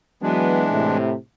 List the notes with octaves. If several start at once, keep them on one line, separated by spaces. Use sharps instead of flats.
E3 F#3 G#3 B3 D4
A2 C3